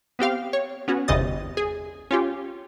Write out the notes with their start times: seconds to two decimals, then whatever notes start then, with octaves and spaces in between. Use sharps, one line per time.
0.19 B3 C4 G4 F5
0.53 C#5
0.88 B3 C#4 F#4
1.08 G1 E2 C3 D#5 D#6 A6
1.57 G#4
2.11 C#4 F4 G4